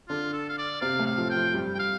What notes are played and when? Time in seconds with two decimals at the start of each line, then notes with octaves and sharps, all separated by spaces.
0.09 D3 D4 F4
0.33 A4
0.49 F5
0.58 D5
0.81 C3 C4 F5
0.99 A2 A3
1.06 F5
1.18 F3
1.30 G5
1.37 F3
1.54 G2 G3
1.75 G5
1.79 F5